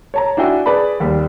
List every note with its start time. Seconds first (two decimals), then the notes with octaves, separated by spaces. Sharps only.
0.14 C#5 A5 A#5
0.37 D4 E4 F#4 G5 G#5
0.66 G#4 B4 D5 A5 B5
1.00 D#2 G3